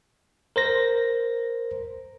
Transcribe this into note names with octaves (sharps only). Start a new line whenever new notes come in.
A#4 C5 A#6